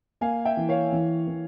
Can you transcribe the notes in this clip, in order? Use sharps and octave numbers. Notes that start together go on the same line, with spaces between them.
A#3 F5 G#5
E5 G5
E3
C#5 F5
E3
E3